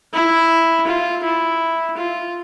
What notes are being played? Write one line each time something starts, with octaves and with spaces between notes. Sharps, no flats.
E4
F4
E4
F4